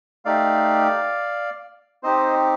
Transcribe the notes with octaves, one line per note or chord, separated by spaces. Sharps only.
A3 D#4 G4 D5 F5
C4 D#4 G4 C5 D#5